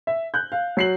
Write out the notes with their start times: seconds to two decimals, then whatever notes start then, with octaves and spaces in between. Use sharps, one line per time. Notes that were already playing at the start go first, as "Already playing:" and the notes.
0.07 E5
0.34 F#6 G6
0.52 F5
0.77 F#3 C7 F#7